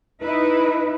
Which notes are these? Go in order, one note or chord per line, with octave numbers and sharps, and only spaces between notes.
D#4 E4 B4